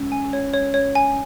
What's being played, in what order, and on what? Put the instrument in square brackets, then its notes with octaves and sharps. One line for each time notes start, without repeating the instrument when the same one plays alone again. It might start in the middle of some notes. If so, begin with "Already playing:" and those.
Already playing: [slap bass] G#3 C#4
[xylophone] G#5
C#5
C#5
C#5
G#5